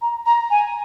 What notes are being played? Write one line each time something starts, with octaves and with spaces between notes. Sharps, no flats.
A#5
A#5
G#5